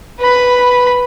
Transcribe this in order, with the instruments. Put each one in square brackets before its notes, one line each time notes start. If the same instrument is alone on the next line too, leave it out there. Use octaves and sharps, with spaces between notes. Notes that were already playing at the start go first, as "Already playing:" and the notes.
[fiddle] B4 B5